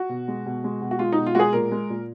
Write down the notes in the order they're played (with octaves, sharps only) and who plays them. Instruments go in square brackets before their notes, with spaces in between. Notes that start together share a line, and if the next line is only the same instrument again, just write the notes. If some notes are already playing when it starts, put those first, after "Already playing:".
Already playing: [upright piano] F#4
B2
G#3
B2
G#3
B2
F#4
G#3 F4
D#4
B2
F4
G#3 F#4 G#4
A#2 A#4
G#3
A#2